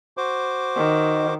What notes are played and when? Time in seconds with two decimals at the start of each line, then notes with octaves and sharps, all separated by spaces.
0.17 F#4 C5 D6
0.76 D#3